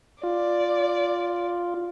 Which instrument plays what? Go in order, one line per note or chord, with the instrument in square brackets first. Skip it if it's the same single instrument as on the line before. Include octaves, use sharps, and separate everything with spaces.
[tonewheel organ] F4 [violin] D5